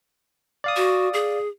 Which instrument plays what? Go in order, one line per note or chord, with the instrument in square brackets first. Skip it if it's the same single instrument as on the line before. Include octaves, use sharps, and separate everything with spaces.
[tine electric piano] D5 F5 D#6
[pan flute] F#4
G#4